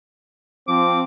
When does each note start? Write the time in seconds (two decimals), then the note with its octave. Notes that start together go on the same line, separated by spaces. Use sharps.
0.68 F3 C4 D6